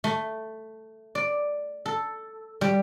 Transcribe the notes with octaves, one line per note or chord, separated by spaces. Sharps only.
A3
D5
A4
G3